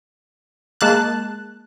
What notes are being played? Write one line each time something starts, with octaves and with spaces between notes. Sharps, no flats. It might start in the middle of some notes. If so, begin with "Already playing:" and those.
G#3 A#3 A5 F#6